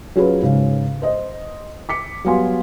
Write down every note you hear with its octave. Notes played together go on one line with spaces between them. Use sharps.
F#3 C#4 F4 G#4 B4
G#2 C#3
C5 D#5
D6 B6 C#7
F#3 G3 B3 F5 G#5 C6